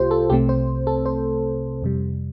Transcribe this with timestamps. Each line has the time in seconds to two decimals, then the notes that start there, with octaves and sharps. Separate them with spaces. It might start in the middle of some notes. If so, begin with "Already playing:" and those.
Already playing: C2 C3 A3 F4 G4 C5
0.11 A4
0.30 C2 C3 A3 C4 G4
0.49 C5
0.87 A4
1.06 C5
1.82 F2 C3 G3